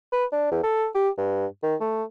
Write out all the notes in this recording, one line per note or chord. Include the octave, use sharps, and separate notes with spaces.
B4
D4
E2
A4
G4
G2
D#3
A3